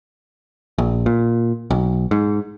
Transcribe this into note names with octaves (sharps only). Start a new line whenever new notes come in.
A#1
A#2
B1
G#2